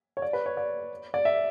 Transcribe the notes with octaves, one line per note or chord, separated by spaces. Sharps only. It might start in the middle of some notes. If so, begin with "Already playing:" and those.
C#5
D5
B4
C#5
D5
D5
E5